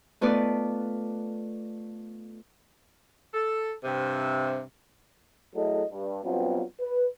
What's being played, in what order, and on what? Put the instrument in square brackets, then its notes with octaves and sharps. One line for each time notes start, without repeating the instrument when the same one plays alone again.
[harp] A3 B3 D#4 F4 B4 D5
[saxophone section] A4
G2 C3
[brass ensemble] F#3 A3 E4 G#4 A4 D#5
G2
G2 B2 F#3 B3 C4 F4
B4